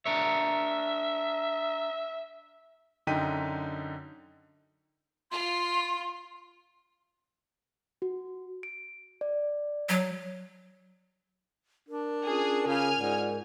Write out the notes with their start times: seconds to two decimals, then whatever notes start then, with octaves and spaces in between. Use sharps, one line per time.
0.05 D4 A#4 C#5 E5
3.07 F#2 D3 D#4 G5 B6 D#7
5.31 F4 C6
8.02 F#4
8.63 D7
9.21 D5
9.89 F#3
11.89 D4 A#4
12.26 C#4 F4 G#4 D#6
12.67 C#3 G#5 F6
12.99 G#2 F4 D5 F#5